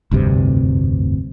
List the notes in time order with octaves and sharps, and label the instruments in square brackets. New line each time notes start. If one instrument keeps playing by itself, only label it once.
[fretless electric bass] F1 D2 G2 C3